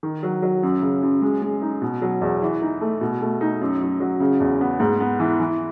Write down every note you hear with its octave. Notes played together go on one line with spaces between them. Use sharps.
D#3
F#3
F#3
F#2
C#3
F#2
G#3
G#3
D#4
B2
F#3
E2
E3
D#4
A3
B2
A3
D#4
F#2
F#2
F#3
C#3
E2
B3
G#2
B3
E3
E3